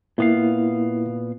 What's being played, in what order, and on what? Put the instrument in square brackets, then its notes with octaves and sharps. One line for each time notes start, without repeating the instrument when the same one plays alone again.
[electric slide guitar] A#2 B3 F5 [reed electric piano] A#3 E4